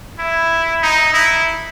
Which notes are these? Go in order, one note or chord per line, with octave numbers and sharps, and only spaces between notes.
E4
D#4
E4